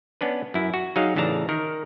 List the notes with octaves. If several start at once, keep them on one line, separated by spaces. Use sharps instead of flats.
B3 C#4 D4 B4
F#2 E4
F#4
F#3 D#4 G#4 F5
A1 C#3 E3 D4 A5 A#5
D#3 A#4